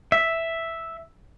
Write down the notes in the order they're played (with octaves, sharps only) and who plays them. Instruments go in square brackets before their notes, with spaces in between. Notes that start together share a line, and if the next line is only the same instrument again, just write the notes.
[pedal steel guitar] E5